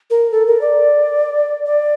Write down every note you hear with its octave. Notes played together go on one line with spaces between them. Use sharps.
A#4
A4
A#4
D5
D5